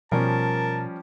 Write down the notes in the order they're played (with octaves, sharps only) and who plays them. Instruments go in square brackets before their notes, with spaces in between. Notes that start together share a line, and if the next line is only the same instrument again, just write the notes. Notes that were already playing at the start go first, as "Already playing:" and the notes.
[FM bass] B2 [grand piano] F3 G3 C#4 [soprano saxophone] A#4 [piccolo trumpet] A5